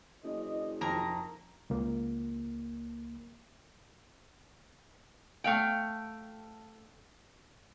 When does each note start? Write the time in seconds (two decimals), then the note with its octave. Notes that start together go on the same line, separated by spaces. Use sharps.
0.24 F#1 E3 D4 D#5
0.81 F2 C3 D#4 A#4 A#5
1.70 C#2 A#3
5.44 A3 F5 G5